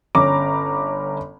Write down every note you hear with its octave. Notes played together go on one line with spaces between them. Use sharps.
G1 C#4 A#5 D6